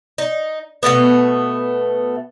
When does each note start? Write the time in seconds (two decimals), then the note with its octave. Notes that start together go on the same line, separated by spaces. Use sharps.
0.18 D#4
0.83 B2 D#3 A3 B3